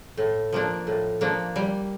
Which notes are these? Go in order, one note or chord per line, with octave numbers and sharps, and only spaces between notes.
A2
F3 A#3 D4
A2
F3 A#3 D4
G3